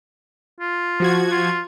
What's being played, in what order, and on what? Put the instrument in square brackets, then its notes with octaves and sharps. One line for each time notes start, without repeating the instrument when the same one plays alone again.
[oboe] F4
[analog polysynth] F3 F#4 G#6
[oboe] F4